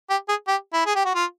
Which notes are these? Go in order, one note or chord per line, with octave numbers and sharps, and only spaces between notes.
G4
G#4
G4
E4
G#4
G4
F#4
F4